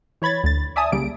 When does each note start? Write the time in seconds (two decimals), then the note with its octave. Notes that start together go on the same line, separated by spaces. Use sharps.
0.22 E3 C#5 B5 G#6 A6
0.44 D2 A6
0.76 D5 E5 G#5 A5 D#6
0.92 C2 C#3 G3 A#3 D7